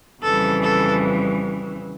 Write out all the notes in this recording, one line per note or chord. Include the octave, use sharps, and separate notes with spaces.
F2 C#3 E3 G3 A4
A4